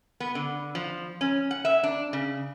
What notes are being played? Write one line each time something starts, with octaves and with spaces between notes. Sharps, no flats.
B3
D3
F3
C#4
F#5
E5
D4
C#3